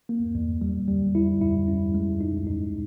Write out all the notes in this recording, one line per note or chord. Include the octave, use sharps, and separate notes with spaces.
A#3
E2
G3
G3
E4
E4
C#4
G#3
D#4
D#4